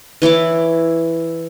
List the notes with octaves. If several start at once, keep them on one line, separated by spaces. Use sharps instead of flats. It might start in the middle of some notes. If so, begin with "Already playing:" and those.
E3 E4 C#5 D6